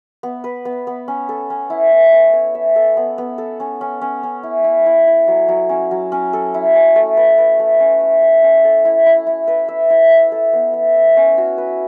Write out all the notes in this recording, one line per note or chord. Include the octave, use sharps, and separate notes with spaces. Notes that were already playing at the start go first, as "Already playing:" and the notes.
B3
B4
B3
B3
C#4
A4
C#4
E4
E4
A4
C#5
E5
A4
B3
B3
A4
C#4
C#4
C#4
C#4
E4
E4
E4
E4
F#3
F#3
C#4
F#3
C#4
A4
E4
C#4
A3
B4
B4
A3
C#4
E5
E5
C#4
A4
E4
E4
E4
B4
E5
E4
E5
A4
B3
E5
E5
C#4
F#4
B4